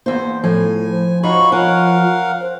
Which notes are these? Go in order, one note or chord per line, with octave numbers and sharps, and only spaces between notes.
E2 A#3 C5
A2 F3 A4 G#5
C5
D#4 F4 F#4 C#5 B5 C#6
C#4 F4 A#4 F5 F#5
C5